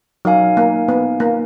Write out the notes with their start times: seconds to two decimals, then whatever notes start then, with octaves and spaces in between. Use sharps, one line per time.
0.25 F#3 D#4 A#4 F5 G#5
0.57 A#3
0.88 B3
1.20 A#3